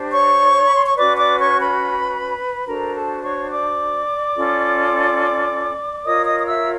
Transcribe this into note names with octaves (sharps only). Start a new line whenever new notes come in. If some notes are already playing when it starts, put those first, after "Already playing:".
Already playing: D4 G4 C5
C#5 C#6
B5
C6
C#6
C#4 F#4 B4 D5 D6
D5 D6
C#5 C#6
B4 B5
D4 F#4 A4 A#4 C5 A#5
A4 A5
C#5 C#6
D5 D6
C#4 F4 A4
F4 A#4 C#5 D#5 D#6
D#5 D#6
D#6
E5 E6